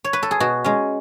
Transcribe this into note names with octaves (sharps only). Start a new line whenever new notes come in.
C#5
B4
A4
G#4
B2 F#4
G#3 C#4